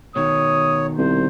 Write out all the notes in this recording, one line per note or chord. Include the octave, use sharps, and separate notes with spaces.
B2 D#3 C#5 D#6
C2 C5